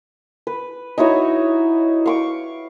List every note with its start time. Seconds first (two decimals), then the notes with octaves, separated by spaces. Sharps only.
0.47 B4
0.98 D#4 E4 F#4 C#5
2.06 F5 C#6 D6